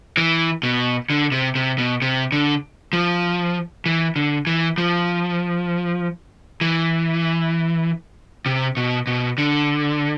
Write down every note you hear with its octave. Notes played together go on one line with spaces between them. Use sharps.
E3
B2
D3
C3
C3
B2
C3
D3
F3
E3
D3
E3
F3
E3
C3
B2
B2
D3